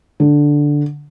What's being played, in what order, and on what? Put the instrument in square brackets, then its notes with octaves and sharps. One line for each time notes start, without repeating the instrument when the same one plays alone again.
[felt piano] D3